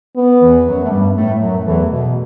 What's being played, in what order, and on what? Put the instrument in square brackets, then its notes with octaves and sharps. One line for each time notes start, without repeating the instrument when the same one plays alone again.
[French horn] B3
[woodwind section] E2 E3
F#2 F#3
A3
G2 G3
A2 A3
F#2 F#3
[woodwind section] E2 E3 [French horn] A3
[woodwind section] B2